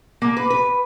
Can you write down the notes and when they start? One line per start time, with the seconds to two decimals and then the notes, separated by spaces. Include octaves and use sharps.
0.22 A#3
0.37 B4
0.50 B4